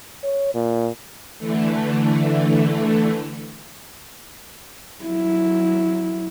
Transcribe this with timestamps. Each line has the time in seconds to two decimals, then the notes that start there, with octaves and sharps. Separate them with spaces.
0.24 C#5
0.54 A#2
1.38 D3 E3 A3
5.04 F#3 E4